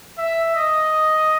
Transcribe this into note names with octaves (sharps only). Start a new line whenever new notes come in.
E5
D#5